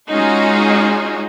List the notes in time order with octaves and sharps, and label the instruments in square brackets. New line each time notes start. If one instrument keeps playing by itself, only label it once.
[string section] G#3 C#4 D#4 F4 F#4 G#4